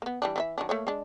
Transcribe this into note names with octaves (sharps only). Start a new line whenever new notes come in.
A#3 B3
E3 G3 D4
E3 D#4 E5
D#3 F#3 D4
A3 A#3 C#5
G#3 D4